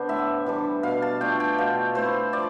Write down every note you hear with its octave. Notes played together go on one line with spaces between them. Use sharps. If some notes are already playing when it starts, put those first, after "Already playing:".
Already playing: D3 B3 D4 C5
A2 E5
E3 G3 D4
B2 F5
A5
A3 D4 F4 G5
G5
B2 F5
A3 C4 E4 C5
F3 D5